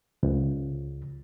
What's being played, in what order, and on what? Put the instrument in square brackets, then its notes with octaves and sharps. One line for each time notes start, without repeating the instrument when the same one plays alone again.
[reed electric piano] C#2